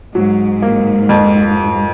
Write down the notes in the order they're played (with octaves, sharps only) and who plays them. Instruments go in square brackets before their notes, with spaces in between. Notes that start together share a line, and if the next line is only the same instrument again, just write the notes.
[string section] G#2 [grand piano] F#3
[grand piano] A#3
F2